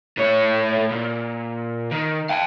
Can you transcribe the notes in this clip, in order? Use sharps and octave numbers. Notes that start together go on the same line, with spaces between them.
A2 C#5
A#2
D#3
F5 G5